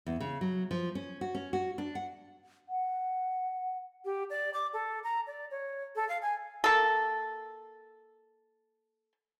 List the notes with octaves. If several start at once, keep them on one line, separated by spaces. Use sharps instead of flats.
E2
C#3
F#3
F3
C#4
F#4
C#4
F#4
D4
F#5
F#5
G4
D5
D6
A4
A#5
D5
C#5
A4
F5
G#5
A#3 A4